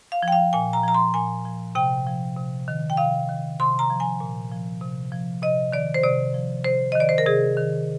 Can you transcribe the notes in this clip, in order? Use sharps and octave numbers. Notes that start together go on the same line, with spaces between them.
F5
F3
G5
F5
A#2 G#5
A#5
F3 A#5
C6
A#2 G#5
F3
C3 G5
F3
C3
D#3
G5
C3 F5
D#3
C3 C6
A#5
F3
G#5
A#2
F3
C3
F3
C3 D#5
D#3 D5
C5
C3 D5
F3
C3 C5
D#3 D#5
D5
C5
A#4
C3 G#4
D#3